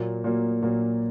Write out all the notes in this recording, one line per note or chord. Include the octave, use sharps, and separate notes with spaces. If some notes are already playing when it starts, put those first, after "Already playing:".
Already playing: A#2 F#3 A#3
A#2 F#3 A#3
A#2 F#3 A#3